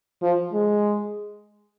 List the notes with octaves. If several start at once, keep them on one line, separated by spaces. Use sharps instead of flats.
F3
G#3